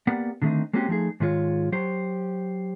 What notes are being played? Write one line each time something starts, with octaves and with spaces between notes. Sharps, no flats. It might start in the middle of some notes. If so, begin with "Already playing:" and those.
A#3 B3 G4 A#4 D5 F#5
D3 D#3 G3 A3 C4 D#4
G#3 A#3 C4 C#4 F#4 G4
F3 A3 D#4 G#4
G#2 D#3 G#3 E4 F4 C#5
F#3 G4 C5